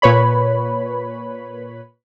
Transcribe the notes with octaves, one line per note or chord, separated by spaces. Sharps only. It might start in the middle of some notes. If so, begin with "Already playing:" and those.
A#2 B4 C#5 B5